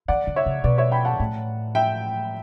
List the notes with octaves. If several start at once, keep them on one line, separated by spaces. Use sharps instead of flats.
E3 D5 F#5
D3
C#5 E5
C#3
B2 B4 D5
C#5 E5
G5 B5
F#5 A5
A2
E5 G5